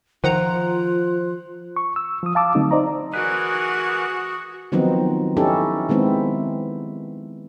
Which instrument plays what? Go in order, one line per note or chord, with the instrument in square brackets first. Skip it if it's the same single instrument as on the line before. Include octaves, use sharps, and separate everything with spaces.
[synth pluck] D#3 F#5 A#5 [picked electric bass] F3 [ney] F4 [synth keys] C5 F#6
[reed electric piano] C#6
E6
F3 D#6
F5 A5 D6 E6
D3 F#3 A3 C4 D#4
D#4 C5 D5 D#5 A#5
[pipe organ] E3 A#4 [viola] F#4 [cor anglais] G#4 [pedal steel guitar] B4
[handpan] D#3 F3 F#3 B3 C4 D#4
C#4 D#4 E4 G4 A4
D#3 G#3 B3 C4 E4